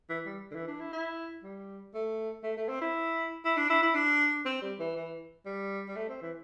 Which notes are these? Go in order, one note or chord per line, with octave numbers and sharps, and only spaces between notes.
E3
G3
D3
E3
D4
E4
E4
G3
A3
A3
A3
C4
E4
E4
D4
E4
E4
D4
C4
G3
E3
E3
G3
G3
A3
C4
E3